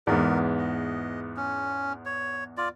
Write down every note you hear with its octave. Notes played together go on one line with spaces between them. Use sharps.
E2 G#2 B3 A#4
D#5
C#4
C#5
F4 D5